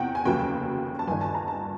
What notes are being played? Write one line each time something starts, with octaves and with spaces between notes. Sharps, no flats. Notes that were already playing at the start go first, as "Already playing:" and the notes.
Already playing: E2 C3 F#5 G5
G#5
F1 D#2 C#3 F#3 G5
A5
G1 G2 D#3 G#5
A5
A#5
A5